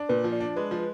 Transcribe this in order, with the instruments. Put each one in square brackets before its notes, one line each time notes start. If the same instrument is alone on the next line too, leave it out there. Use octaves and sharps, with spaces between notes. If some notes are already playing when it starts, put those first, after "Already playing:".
Already playing: [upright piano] D4
[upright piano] A#2 [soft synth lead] B4
[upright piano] F3
[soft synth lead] D5
[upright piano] D4
[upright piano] G#3 [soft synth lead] B4
[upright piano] F3